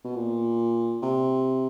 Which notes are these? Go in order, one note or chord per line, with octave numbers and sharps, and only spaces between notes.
B2
A#2
C3